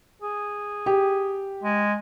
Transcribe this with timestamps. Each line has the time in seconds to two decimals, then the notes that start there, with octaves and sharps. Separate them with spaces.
0.22 G#4
0.86 G4
1.64 G#3